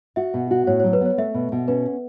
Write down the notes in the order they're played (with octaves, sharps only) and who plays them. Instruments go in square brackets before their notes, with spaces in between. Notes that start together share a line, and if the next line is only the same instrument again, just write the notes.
[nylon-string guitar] F#4 [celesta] E5
[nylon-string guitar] B2
F#4
[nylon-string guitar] A2 [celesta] C#5
[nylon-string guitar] F#3 [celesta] C#5
[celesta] B4
[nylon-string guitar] B3 [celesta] C#5
[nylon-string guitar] A3 [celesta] E5
[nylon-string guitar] B2
B2
[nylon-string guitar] C#4 [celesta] B4